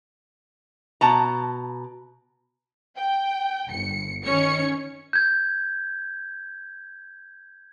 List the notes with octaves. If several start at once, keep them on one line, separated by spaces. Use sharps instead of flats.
B2 A5 A#5
G5
G1 C#7
D#3 C#4 C#5 C#7
G6 G#6